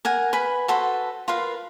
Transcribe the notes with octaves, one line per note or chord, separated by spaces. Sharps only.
A#4 F#5 G#5
B4 G#5 B5
F#4 A4 B4 C5
F4 A#4 B4 F5